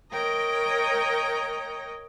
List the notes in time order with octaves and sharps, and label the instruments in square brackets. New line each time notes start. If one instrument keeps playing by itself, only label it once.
[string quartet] A#4 C#5 D#5 G5 A#5